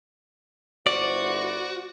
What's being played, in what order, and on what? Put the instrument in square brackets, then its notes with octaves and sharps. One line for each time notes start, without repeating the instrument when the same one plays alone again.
[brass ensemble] G1 E4 C5 [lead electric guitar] F#4 [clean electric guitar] D5